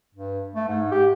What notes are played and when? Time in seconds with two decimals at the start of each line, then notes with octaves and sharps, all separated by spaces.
0.15 G2
0.55 A3
0.68 G#2
0.91 G4